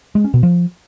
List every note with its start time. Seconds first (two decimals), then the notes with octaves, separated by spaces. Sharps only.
0.15 G#3
0.24 C#4
0.34 B2
0.43 F3